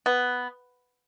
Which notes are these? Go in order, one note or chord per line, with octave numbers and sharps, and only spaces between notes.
B3